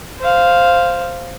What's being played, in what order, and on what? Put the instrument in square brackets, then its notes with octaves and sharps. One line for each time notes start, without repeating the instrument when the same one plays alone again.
[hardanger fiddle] C5 F5